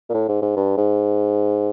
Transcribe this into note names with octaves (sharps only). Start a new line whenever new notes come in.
A#2
A2
G#2
G#2
G2
G#2